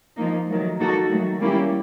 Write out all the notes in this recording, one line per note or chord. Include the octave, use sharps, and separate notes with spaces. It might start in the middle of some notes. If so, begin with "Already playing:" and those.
F3 A#3 D#4
D#3 F#3 A3
A#3 D#4 F#4 A4
D#3 F#3 A3
G3 A#3 C#4 E4 G4